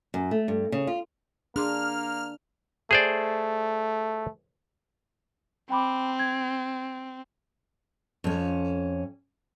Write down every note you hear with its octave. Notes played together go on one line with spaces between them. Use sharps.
F#2
A3
G2
C#3
F4
A#3 D4 G#4 C6 D6 F6
A3 G#4 C5 D5
C4 G5 B5 D6
G#6
F2 C#4